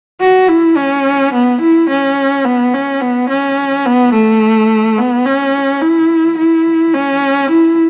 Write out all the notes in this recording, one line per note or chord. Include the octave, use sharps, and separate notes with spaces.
F#4
E4
C#4
B3
E4
C#4
B3
C#4
B3
C#4
B3
A3
B3
C#4
E4
E4
C#4
E4